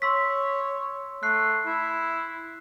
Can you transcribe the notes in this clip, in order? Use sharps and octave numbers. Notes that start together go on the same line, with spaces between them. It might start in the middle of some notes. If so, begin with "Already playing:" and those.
C#5 C6 E6 B6
A3 F#6 C7
E4